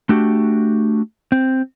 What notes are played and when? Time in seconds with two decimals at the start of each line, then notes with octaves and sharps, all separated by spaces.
0.09 A3 D4 F#4 G4
1.32 C4